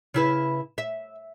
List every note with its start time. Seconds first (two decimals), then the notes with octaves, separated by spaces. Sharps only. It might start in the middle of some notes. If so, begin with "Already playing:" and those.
0.14 C#3 E4 B4
0.78 E5